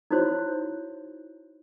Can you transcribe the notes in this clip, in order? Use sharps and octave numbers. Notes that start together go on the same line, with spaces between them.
D#4 E4 F#4 C5 C#5 C6